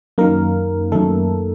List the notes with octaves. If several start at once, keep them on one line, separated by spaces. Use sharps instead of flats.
F#2 D#3 A#3 A#4
F#2 D#3 A3 A4